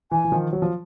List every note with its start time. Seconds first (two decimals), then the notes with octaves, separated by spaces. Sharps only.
0.11 E3 G#5
0.25 E3
0.32 D#3 F3
0.53 F#3
0.62 F3